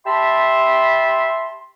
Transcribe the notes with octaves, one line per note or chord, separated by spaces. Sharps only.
G4 E5 A5 B5 C6